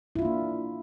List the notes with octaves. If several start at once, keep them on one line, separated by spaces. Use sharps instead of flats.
A#3 D4 E4 F4